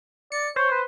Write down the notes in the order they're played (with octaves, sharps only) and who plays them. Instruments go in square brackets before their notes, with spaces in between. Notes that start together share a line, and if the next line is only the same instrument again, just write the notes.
[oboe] D5 [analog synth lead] C#7
[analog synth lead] C5 [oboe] C#5
[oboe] B4